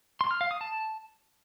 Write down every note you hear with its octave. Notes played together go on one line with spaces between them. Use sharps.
C6
F6
F5
D#6
A5